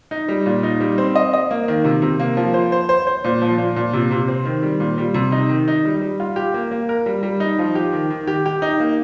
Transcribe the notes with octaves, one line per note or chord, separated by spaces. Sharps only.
D#4
G3
A#2
D#4
G3
C4
D#5
D#5
A#3
D#3
C3
C3
A#3
F3
C5
C5
C5
C5
A#2
F3
A#2
A#2
C3
C3
C4
D#3
G3
A#2
G3
C3
D#4
D#3
D#4
G3
G3
F4
G4
A#3
A#3
A#4
G3
G3
D#4
F3
G4
D#3
D#3
G4
G4
D#4
A#3